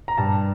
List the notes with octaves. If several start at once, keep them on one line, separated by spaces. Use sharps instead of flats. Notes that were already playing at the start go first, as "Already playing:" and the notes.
A#5
G2 A5